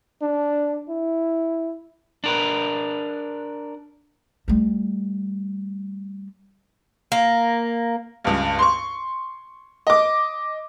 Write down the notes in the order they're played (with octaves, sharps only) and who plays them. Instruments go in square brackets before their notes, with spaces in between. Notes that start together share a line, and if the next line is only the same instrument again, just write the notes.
[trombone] D4
E4
[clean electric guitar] D4 A#4 B4
[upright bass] G3 A3
[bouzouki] A#3
[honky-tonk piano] C#2 G2
C6 C#6
D#5 D6